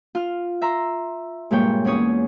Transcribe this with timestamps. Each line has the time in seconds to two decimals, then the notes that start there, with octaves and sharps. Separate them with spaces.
0.15 F4 F6
0.62 E5 A#5 C6
1.51 G2 A#2 G#3 A#3 C#5 G5
1.85 E2 C#4 G#4 C#5 D#6